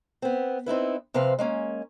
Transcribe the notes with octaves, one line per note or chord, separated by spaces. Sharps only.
B3 C4
C4 D#4 E4 B4
C3 F3 C4 B4 F5
G#3 A#3 C#4